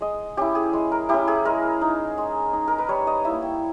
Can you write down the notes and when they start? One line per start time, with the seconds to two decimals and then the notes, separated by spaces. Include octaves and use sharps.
0.01 G#3 D#5
0.37 C#4 E4 G4
0.55 G#4
0.73 G#3
0.92 A#4
1.09 C#4 E4 G4
1.28 G#4
1.45 G#3 A#4
1.81 D#4
2.18 G#3
2.53 D#4
2.68 A#4
2.78 B4
2.88 G3 C#5
3.07 D#5
3.25 A#3 E4 E5
3.42 G5